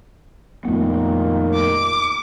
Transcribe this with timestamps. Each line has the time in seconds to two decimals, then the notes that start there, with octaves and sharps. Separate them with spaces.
0.65 F2 A#2 D#3 A3 B3
1.54 D6